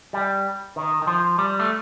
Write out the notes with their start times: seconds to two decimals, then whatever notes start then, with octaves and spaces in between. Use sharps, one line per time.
0.13 G3
0.76 D#3
1.02 D#3
1.07 F3
1.38 G3
1.59 A3